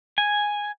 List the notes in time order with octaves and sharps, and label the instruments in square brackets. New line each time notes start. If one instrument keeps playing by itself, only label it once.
[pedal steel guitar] G#5